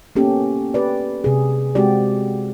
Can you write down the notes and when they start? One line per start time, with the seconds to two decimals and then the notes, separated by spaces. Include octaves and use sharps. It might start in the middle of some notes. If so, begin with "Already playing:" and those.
0.16 A#3 B3 C#4 G4 A4
0.74 G4 B4 D5
1.24 C3 G#4
1.75 G#3 C4 F#4 G4 D5